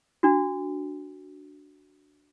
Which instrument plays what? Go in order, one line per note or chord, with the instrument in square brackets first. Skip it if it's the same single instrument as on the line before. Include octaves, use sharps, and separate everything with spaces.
[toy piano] D4 F#4